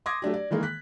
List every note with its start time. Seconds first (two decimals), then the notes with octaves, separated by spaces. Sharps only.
0.06 C6 D6 D#6 G#6 A#6
0.22 F#3 A3 D4 G4
0.34 D5
0.51 D#3 E3 G#3 A#3
0.63 F#6 B6